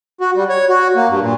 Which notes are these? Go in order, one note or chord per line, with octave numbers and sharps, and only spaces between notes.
F#4
G3
C#5
F#4
A#3
G2
A#2